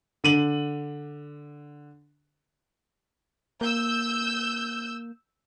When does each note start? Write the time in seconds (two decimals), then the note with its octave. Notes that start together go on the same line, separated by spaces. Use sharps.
0.24 D3 D#7 F#7
3.61 A#3 E6 G6